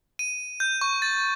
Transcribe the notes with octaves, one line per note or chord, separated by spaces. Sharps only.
D#7
G6
C#6
A6